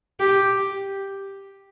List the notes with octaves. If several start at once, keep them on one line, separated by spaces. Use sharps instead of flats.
G4